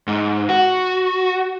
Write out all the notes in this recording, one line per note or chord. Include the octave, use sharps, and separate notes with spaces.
G#2
F#4